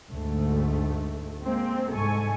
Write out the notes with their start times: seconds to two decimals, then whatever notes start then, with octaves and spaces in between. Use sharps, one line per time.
0.11 D2 G#2 A3
1.43 G#3 A#3 C4
1.92 C2 G#2 A4 G#5 C#6